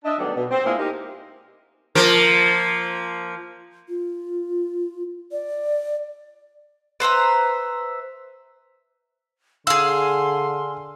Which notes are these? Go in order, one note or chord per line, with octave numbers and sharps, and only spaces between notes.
D4 D#5 E5
D#3 F#3 G3 A3 B3 D5
B2
C4
G#3 A#3 B3 D4 E4 F4
D#4 G4 A#4
F3 A#3 A#4
F4
D5
B4 C5 E5 A#5
D3 G#4 F5 C6 E6